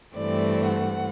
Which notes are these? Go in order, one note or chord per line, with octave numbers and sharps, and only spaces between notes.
G2 E3 A3 C4 D5
F#5